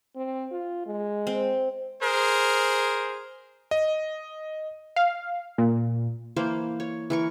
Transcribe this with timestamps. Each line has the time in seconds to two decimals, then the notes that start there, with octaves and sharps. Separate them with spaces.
0.16 C4
0.52 F4
0.86 G#3
1.27 C4
2.01 G#4 A#4 C5
3.71 D#5
4.96 F5
5.58 A#2
6.36 E3 A#3 C5 F5
6.80 C#5
7.10 E3 A#4 C#6